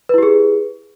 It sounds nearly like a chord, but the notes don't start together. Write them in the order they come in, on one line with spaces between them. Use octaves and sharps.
B4 E4 G4 G#4